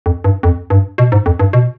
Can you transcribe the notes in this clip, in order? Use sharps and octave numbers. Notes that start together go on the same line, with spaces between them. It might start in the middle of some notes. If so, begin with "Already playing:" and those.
F2
G2
F2
G2
B2
G#2
F2
G2
B2